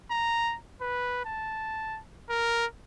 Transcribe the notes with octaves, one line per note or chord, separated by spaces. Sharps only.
A#5
B4
A5
A#4